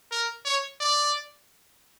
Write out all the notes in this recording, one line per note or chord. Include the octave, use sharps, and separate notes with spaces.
A#4
C#5
D5